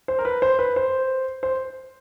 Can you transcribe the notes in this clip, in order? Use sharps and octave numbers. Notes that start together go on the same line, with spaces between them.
C5
A#4
B4
C5
B4
C5
C5